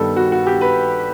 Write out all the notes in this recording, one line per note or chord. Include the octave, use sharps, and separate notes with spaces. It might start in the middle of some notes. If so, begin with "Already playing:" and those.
Already playing: G2 D#3 G3 B3 A4
F#4
F#4
G4
B4